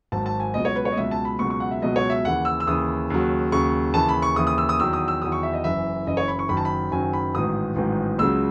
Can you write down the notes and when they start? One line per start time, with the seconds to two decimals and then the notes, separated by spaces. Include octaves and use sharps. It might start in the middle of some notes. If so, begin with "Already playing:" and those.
0.12 G#1 G#2 F#3 A5
0.26 A5
0.40 G#5
0.54 C#2 B2 F#3 D#5
0.65 C#5
0.75 B4
0.85 C#5
0.92 D#5
0.97 C#2 B2 F#3 E5
1.11 A5
1.25 B5
1.39 C#2 B2 F#3 C#6
1.50 C#6
1.60 F#5
1.71 E5
1.82 C#2 B2 F#3 D#5
1.96 C#5
2.10 E5
2.25 D#2 C#3 E3 F#5
2.45 E6
2.60 E6
2.67 D#2 C#3 E3 D#6
3.10 D#2 C#3 F#3
3.52 D#2 C#3 F#3 C#6
3.94 D#2 C#3 E3 A5
4.09 B5
4.22 C#6
4.36 D#2 C#3 E3 D#6
4.47 D#6
4.58 E6
4.69 D#6
4.79 E2 D#3 F#3 E6
4.93 D#6
5.08 E6
5.22 E2 D#3 F#3 D#6
5.32 C#6
5.43 E5
5.53 D#5
5.64 F#1 F#2 E3 E5
6.07 F#1 F#2 E3 D#5
6.17 C#5
6.28 B5
6.39 C#6
6.49 F#1 F#2 D#3 F#3 B5
6.57 A5
6.65 B5
6.92 F#1 F#2 D#3 F#3 G#5
7.13 B5
7.34 A1 G#2 D#3 F#3 D#6
7.76 A1 G#2 D#3 F#3
8.18 C#2 C#3 F#3 E6